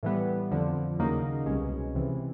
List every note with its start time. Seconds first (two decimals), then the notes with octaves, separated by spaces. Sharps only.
0.03 A2 E3 G3 B3
0.51 F2 D3 F3
0.99 D#2 C#3 F#3 A#3 D#4
1.46 C2 B2 G#3 C#4
1.94 C#2 C3 E3